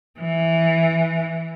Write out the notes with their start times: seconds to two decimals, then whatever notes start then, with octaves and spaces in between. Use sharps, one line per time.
0.19 E3